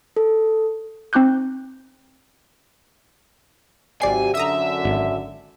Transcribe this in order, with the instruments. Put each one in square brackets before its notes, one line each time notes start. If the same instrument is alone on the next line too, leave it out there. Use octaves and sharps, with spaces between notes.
[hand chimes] A4
[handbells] C4 D#4 D6 F#6 G6
[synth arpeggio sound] G#1 D5 C7 [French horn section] C3 F#3 G4 [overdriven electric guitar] G#5
[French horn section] F#2 D3 [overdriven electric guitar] E5 [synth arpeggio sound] A#5 D#6 E6
[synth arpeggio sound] G#1